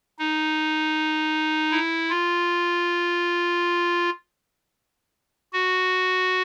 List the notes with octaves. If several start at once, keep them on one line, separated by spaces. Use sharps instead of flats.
D#4
E4
F4
F#4